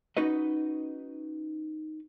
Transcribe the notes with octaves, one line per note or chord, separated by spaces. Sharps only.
C#4 D#4 F#4 B4 D#5